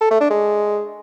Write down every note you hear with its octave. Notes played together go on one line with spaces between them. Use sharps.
A4
A3
D4
G#3